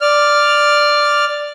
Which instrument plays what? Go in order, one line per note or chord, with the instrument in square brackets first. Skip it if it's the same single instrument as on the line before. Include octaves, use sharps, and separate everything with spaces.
[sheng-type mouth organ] D5 F6